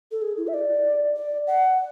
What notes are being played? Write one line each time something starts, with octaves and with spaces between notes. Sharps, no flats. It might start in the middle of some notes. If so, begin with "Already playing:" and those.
A4
G#4
E4
E5
D5
D5
F#5